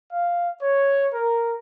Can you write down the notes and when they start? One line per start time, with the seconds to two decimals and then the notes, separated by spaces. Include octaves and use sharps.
0.12 F5
0.62 C#5
1.14 A#4